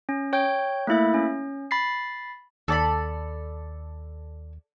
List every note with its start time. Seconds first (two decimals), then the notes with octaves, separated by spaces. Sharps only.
0.09 C#4
0.33 C#5 G5 G6
0.87 A3 A#3 E4 E5
1.14 C#4
1.71 B5 A6 B6 C7
2.68 D#2 A4 D5 B5